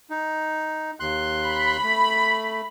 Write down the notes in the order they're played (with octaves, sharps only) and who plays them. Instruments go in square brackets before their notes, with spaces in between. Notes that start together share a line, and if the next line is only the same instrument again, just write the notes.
[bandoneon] D#4
D#2 C6 F#6
[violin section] B5
[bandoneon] A3